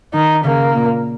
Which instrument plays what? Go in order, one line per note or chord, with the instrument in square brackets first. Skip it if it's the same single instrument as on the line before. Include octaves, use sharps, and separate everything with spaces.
[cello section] D#3 [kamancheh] D#4
[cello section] C#3 [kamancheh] A#3
[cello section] A#2